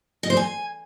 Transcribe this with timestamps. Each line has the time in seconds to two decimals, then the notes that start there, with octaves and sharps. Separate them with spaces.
0.23 D#5
0.30 C5
0.37 G#5